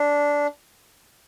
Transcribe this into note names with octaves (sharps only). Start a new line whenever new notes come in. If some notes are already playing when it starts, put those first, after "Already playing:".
Already playing: D4